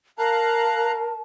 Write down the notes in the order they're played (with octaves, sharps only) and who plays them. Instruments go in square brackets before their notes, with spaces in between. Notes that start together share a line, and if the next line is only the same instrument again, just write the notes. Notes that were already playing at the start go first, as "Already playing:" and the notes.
[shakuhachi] A#4 [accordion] F5 A#5 F#6 [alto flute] A5